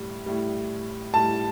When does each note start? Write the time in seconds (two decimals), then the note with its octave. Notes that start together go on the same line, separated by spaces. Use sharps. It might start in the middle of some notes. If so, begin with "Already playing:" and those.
Already playing: A2 G3
0.26 A2 G3
1.13 A2 G3 A5